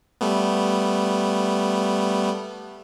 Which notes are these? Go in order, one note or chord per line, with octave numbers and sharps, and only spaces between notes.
G3 A3 B3